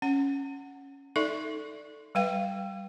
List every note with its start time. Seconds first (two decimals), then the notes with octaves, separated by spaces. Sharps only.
0.02 C#4 F#5
1.16 D#4 A4 D5 E5 C#6
2.15 G3 B4 F5 G5